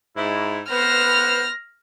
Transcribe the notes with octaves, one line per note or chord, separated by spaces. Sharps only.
G#2 E4
B3 B4 C5 F6 A#6